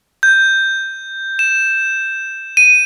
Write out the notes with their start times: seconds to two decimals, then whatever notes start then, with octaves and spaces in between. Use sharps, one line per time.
0.23 G6
1.39 E7
2.57 D#7